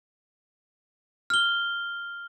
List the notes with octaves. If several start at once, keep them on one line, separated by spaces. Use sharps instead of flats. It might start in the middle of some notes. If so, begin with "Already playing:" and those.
F6 G7